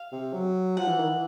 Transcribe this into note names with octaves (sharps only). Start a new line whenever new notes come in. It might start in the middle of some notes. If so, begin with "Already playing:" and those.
Already playing: F5
C3
F#3
F3 F#5
E3
D#3
E3